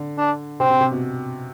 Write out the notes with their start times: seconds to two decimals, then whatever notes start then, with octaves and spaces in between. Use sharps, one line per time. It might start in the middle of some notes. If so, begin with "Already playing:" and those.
Already playing: D3
0.18 D4
0.60 C3 C4
0.70 C3
0.81 C3
0.92 B2